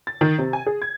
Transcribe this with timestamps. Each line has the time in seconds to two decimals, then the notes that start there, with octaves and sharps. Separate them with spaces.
0.07 A6
0.21 D#3
0.39 C3
0.53 G#5
0.67 G#4
0.82 G#6